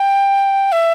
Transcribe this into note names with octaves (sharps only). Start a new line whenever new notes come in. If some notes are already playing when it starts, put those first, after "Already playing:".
Already playing: G5
E5